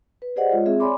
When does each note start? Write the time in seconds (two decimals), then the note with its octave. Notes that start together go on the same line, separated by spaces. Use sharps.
0.22 B4
0.36 G4 G#4 C5 D5 D#5 F#5
0.50 G#3 F4 C#5 D#5
0.66 C4 G#4 E5
0.80 C#5 D5 G#5 B5 C6 D6